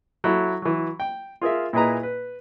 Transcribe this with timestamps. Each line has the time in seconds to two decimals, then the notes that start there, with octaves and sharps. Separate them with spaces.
0.24 F#3 E4 A4
0.62 E3 F#3
1.00 G5
1.41 F4 G#4 A#4 E5
1.73 A#2 E4 G#4 B4 D#5 A#5
2.03 B4